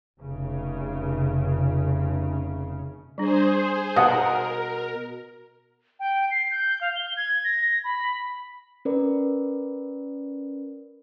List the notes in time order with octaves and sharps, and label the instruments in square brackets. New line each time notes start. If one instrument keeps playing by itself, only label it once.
[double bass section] F1 C#3
[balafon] G3 D4 [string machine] G#4 C5
[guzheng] B2 [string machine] A#4 [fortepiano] F#5 D#6
[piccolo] G5
C7
G6
F5
G7
G#6
A#6
B5
[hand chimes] C#4 A#4 B4 D5